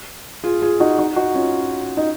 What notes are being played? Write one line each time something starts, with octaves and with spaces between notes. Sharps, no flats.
F4 G#4
F4 G#4
D#4 F#4
D#4 F#4
D#4 F#4
C#4 F4
D#4